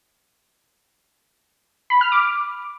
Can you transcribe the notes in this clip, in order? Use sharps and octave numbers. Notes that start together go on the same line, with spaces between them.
B5
F6
D6